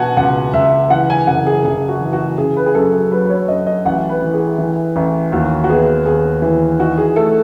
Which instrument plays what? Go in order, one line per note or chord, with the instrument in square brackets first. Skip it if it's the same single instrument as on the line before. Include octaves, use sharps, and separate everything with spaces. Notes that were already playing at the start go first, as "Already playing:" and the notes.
Already playing: [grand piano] B2 [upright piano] F#5 G#5 A5
[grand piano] C#2 [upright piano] F#5
[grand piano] C#2 [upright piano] E5
[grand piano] E3 [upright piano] F#5
[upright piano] G#5
[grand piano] F#1 [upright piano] F#5
[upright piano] G#4
[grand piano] F#1 [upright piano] G#4
[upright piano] F#4
[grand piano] E3
[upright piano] F#4
[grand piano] C#3 [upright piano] G#4
[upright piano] B4
G#4
[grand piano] F#2 [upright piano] A4
[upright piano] G#4
[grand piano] F#3 [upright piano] B4
[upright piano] B4
C#5
[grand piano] F#2 [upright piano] D#5
[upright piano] D#5
[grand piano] A1 [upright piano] F#5
[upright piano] B4
[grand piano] E3
[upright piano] G#4
[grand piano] E3
A1
[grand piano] D#2 [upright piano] F#4
[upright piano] F#4
[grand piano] B3 [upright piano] G#4
[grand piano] D#2 [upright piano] G#4
[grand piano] E3
[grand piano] D#4 [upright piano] F#4
[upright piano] G#4
[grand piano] A3 [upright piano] A4